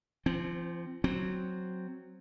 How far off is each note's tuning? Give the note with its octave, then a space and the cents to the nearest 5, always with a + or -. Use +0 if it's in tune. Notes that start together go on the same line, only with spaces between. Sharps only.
F3 -35 C4 +0
F#3 +0 C4 +0